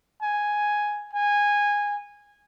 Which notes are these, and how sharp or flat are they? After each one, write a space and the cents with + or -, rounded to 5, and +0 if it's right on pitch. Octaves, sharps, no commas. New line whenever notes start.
G#5 +0
G#5 -15